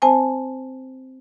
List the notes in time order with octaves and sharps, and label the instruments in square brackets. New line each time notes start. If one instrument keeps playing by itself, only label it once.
[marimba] C4 C5 G#5 A5